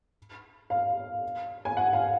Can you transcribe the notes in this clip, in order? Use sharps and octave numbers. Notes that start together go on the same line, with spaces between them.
F5
G#5
F#5
F5